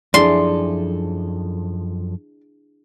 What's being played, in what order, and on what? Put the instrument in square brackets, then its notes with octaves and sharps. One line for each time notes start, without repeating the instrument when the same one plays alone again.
[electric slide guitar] F#2 F3 A4 [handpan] D4 E4 G#4 [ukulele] D5 [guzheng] C6